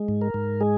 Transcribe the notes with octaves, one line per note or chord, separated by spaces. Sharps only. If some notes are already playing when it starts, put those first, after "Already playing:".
Already playing: G#3
G#2
A#4
G#2
G#3 G#4